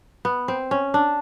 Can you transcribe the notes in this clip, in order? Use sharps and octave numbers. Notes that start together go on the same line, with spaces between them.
B3
C4
C#4
D4